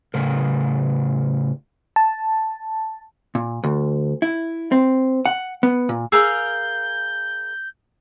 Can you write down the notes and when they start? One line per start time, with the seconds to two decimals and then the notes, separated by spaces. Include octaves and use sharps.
0.14 A2 C#3 A#4
1.96 A5
3.35 A#2
3.64 D2
4.22 E4
4.72 C4
5.26 F#5
5.63 B3
5.89 A#2
6.12 G#4 A#4 F5 E6 G6